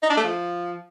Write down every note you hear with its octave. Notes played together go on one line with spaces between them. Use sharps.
D#4
D4
A3
F3